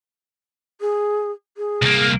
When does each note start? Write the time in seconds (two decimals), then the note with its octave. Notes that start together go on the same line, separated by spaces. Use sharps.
0.81 G#4
1.57 G#4
1.82 C2 A#3